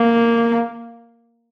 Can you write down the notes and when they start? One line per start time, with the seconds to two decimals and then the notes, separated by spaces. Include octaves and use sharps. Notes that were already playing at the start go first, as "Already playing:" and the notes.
Already playing: A#3